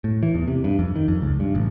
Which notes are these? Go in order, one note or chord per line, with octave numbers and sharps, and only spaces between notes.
A2
E3
E2
C3
G2
F2
D#3
F2
C#2
G2
A1